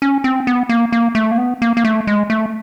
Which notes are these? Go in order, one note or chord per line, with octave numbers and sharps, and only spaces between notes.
C#4
C4
B3
A#3
A#3
A3
A#3
B3
A#3
A#3
A3
G#3
A3